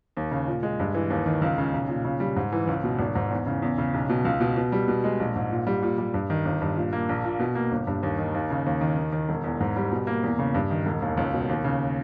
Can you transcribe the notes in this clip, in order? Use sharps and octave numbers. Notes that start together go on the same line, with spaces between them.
D#2
C#3
A#2
G#3
G2
E3
D#2
D#3
C#2
C#3
B1
A#2
C#3
G3
G#2
E3
C#2
B2
G#1
G#2
E2
C#3
E2
C#3
B1
B2
C#2
B2
B2
G3
B2
G#3
A#1
G#2
A#2
G3
A#2
G3
G2
D#3
G1
G2
A#2
A#3
A#1
A#2
B2
A#3
G1
G2
D#2
D#3
D#2
C#3
D#2
D#3
D#2
D#3
E1
E2
G#2
G3
B2
A#3
E2
C#3
G2
D#3
E1
D#2
C#2
B2
D#2
C#3